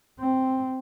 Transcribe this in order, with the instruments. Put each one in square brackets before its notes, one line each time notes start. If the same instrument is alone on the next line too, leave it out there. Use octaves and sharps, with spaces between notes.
[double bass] C4